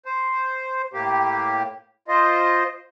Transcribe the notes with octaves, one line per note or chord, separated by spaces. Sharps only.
C5
A2 A#3 G4
F4 C5 D#5